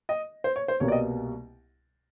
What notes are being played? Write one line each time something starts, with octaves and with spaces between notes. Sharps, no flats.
D#5
C5
C#5
C5
C2 B2 G3 A#3 C#5
D5
D#5